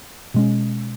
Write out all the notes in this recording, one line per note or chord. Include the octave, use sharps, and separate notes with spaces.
B2 G#3 C#4